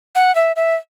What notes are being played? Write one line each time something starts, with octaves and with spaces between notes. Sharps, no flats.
F#5
E5
E5